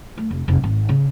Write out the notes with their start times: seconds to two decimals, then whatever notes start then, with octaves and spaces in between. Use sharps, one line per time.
0.17 A3
0.31 F1
0.48 F1
0.64 G#1
0.89 C#3